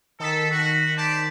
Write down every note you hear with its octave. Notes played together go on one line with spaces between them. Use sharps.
D#3 A4 B6
F#4
C5 D5 A5